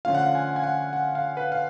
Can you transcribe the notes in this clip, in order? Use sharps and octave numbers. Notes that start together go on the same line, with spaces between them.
D3 F3 A3 C#4 F4 F5
F#5
F5
G#5
G#5
F#5
F#5
F5
B4
F5